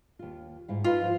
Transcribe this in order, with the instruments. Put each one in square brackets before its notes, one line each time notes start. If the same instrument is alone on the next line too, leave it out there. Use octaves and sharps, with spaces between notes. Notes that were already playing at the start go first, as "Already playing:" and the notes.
[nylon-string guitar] D#2 F4
G#2 E4 F5
[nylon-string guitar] D#4 A4 B4 [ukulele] F4
[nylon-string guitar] F3 C5